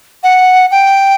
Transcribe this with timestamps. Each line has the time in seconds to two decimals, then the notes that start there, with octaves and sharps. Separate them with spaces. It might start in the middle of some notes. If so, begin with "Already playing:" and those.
0.23 F#5
0.71 G5